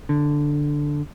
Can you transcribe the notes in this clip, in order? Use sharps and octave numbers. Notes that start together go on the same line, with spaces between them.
D3